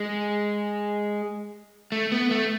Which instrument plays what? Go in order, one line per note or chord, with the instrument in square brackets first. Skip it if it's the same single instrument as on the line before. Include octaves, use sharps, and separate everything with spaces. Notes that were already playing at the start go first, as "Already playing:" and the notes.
Already playing: [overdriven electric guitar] G#3
A3
B3
A3